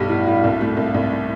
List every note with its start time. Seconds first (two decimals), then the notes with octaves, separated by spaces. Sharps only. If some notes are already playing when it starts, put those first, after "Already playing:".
Already playing: B1 G2 G3
0.09 A2
0.27 A2
0.44 C2
0.61 A3
0.77 C2
0.94 C2